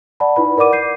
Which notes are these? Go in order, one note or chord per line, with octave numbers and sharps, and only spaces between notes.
D5 F#5 A5 B5
D#4 E4 B4 B5
A#4 D5 F#5 D6 D#7
G6 C7 D#7